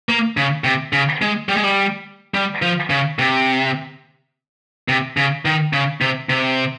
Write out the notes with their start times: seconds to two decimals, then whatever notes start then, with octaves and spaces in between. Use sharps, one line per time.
0.09 A#3
0.37 C#3
0.64 C3
0.93 C#3
1.22 G#3
1.49 G3
1.57 G#3
1.63 G3
2.34 G3
2.62 F3
2.90 C#3
3.19 C3
4.89 C3
5.17 C#3
5.45 D#3
5.73 C#3
6.01 C3
6.29 C3